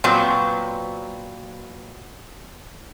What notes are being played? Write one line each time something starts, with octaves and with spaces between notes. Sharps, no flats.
A#2 F#3 B3 C4